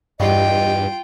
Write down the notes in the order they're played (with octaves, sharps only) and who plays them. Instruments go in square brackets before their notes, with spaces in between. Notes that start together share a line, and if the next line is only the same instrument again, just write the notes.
[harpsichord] E2 G3 C#6 [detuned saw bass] G2 [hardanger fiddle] F4 G5 [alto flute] D#5